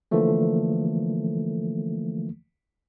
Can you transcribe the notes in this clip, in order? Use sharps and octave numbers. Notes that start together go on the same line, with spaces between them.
D3 E3 F3 A3 A#3